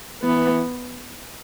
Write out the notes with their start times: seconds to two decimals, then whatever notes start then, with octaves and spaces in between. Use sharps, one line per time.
0.23 E3 B3